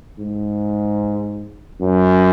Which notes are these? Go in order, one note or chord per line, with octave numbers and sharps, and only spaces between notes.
G#2
F#2